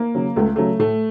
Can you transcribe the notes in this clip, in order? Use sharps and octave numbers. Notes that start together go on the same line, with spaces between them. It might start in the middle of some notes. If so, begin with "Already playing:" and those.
Already playing: A#3
C#3 F#3
C#2 A3
C#3 F#3 A3
A2 A3